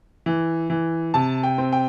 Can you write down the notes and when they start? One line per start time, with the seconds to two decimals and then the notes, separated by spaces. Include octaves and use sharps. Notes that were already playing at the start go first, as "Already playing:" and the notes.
0.26 E3
0.70 E3
1.14 C3 A5
1.43 G5
1.58 C4
1.72 G5